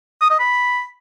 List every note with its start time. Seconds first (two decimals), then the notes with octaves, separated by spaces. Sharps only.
0.21 D#6
0.31 D#5
0.40 B5